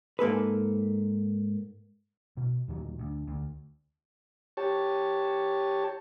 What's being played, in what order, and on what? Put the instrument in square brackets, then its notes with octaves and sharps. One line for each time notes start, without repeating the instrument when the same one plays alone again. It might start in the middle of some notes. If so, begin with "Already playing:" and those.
[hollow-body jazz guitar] G#2 A#3 A4 B4
[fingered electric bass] B2
D#2 A#2 D#3 F#3
D2
D2
[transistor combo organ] G4 C#5 A5